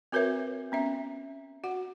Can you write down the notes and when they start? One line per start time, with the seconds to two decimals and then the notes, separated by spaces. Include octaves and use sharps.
0.12 C4 F#4 A#4 B4 C#5 E5
0.72 B3 C#4 E5
1.64 F#4 F#5